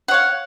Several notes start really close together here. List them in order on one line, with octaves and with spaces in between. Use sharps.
F#5 C#5 F5